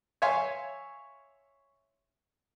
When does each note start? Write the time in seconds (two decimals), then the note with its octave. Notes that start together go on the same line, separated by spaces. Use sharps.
0.22 C#5 E5 F5 G#5 C6